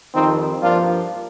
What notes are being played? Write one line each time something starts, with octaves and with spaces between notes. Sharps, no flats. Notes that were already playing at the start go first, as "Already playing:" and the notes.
F2 D#3 G3 C4 D#4
G2 F3 A#3 D4 F4